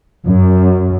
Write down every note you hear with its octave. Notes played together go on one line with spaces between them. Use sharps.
F#2